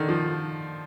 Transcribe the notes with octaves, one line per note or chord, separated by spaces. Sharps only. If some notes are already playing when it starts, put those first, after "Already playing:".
Already playing: D3 D#3
F3